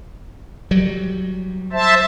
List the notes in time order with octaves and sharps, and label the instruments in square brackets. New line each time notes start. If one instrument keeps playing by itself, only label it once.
[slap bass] F#3 G3
[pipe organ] C5 E5 A5